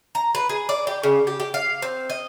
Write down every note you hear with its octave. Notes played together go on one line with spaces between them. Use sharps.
A#5
B4
G#4
D5
G4
C#3
G4
G4
F5
C4
D#5